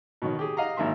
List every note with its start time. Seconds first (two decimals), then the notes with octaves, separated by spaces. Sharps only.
0.22 B2 D#3 C#5
0.39 G4 G#4
0.57 D#5 F5 F#5 A#5
0.77 G#1 D#3 A#3 E5 C6